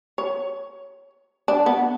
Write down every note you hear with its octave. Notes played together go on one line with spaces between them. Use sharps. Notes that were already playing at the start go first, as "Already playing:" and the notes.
C#5
D4
B3